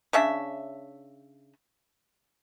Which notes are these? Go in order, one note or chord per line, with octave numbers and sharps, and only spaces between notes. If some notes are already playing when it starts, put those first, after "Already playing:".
C#3 C#4 D4 E5